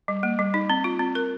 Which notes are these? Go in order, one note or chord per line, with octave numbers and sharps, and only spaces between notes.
G3
A#3
G3
D#4
C4
F4
C4
A#4